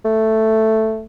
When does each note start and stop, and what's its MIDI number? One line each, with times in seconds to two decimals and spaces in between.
0.05 1.04 57